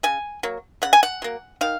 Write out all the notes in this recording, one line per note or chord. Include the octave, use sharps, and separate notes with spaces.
C#3 G#5
F#3 A#3
C#3 F#5
G#5
F#5
F#3 A#3
D#3 F5